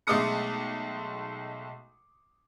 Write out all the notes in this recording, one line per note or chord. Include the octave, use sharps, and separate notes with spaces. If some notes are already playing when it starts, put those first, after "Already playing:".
B1 G#3 A3 D6 D#6 C#7